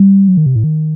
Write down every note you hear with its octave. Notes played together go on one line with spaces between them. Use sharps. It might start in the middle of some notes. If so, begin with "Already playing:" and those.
Already playing: G3
F#3
D#3
C3
A2
D#3